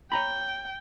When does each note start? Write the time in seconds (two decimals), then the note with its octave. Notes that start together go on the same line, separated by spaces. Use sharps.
0.12 C#5 G5 A#5 B5